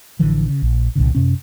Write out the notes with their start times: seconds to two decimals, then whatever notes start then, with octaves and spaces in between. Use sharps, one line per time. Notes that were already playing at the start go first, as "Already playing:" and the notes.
0.19 A1 D3 E3 F3
0.47 C#3
0.62 A#1
0.96 C2 A#2 D3
1.15 F#2 C3 C#4